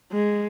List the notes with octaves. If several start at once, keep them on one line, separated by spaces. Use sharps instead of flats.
G#3